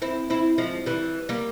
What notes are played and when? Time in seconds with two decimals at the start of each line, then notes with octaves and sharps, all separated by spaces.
0.02 C4 E4
0.30 C4 E4
0.58 F3 G#3
0.86 E3 G3
1.29 G3 A#3